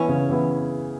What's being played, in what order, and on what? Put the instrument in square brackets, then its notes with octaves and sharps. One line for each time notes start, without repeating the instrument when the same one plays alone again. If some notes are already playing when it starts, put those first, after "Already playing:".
Already playing: [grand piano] E3 B3 E4 [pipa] C#4
[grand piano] C#3
E3 B3 E4